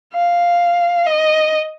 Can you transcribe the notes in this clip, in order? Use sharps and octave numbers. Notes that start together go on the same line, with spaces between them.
F5
D#5